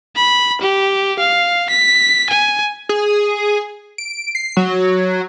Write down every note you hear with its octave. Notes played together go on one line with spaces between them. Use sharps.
B5
G4
F5
B6
G#5
G#4
D7
C7
F#3